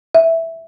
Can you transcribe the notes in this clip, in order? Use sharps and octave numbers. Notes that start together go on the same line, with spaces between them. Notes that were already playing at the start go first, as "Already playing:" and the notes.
E5